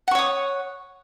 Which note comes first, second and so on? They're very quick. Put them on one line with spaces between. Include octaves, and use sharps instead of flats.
F#5 C#6 C#5 D#6